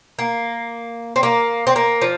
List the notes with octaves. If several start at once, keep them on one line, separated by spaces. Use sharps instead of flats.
A#3
C4
A#3
C4
A#3
F3